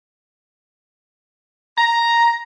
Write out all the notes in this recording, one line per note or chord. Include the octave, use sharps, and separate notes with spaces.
A#5